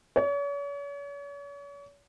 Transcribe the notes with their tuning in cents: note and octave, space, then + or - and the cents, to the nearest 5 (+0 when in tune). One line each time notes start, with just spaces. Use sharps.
C#5 +40